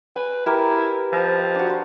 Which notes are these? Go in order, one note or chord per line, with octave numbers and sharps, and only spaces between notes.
B4 G#5
E4 G4 A#4 B4
F3
D4 F#4
F#4 C5